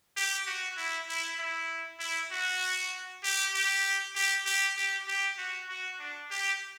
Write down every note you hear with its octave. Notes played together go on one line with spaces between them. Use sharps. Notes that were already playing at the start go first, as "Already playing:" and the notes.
G4
F#4
E4
E4
E4
E4
F#4
G4
G4
G4
G4
G4
G4
F#4
F#4
D4
G4